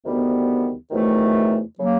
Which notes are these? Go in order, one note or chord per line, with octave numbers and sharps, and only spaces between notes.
D2 C3 D#3 G3 B3
E2 C3 D#3 F#3 A3
C#3 F#3 A#3